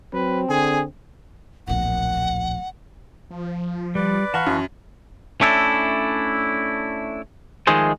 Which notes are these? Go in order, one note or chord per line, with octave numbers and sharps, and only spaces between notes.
F#3 C4 B4
D3 G#4 G#5
D1 A#1 F#5
F3
G3 B4 D5
E3 B4 F5 F#5 A5 A#5 C#6
F#2
A3 C#4 D4 E4 A4
D#3 F3 G#3 A3 G#4 C5